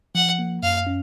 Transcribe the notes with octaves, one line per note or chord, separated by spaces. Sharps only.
F3 F#5
A#3
F#2 F5
C#4